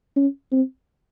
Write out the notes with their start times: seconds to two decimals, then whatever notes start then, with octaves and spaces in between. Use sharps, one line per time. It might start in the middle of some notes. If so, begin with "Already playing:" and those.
0.17 C#4
0.52 C4